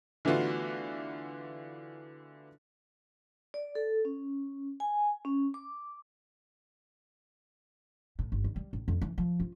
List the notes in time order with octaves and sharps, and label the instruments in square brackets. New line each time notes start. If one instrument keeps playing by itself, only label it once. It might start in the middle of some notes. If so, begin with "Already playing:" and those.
[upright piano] D3 E3 A3 B3 F4 F#4
[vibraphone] D5
A4
C#4
G#5
C#4
D6
[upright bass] A2
G1
D#3
G3
A1
F2
E3
F3
F4